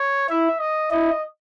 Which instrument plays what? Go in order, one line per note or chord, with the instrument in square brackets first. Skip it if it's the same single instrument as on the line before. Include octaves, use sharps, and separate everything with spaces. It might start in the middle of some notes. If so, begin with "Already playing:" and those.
Already playing: [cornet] C#5
[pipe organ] E4 [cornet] E5
[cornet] D#5
[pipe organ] E4 [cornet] D#5